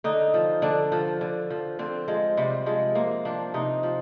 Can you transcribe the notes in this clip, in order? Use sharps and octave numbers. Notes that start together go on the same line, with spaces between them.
D3 D#4
F3
D3 D4
F3
D3
F3
D3 C4
F3 G#3
C3 G3
F3 G#3
C3 A#3
F3 D4
C3 D#4
F3